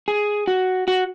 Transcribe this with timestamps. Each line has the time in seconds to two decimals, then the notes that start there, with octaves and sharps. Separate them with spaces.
0.08 G#4
0.48 F#4
0.88 F#4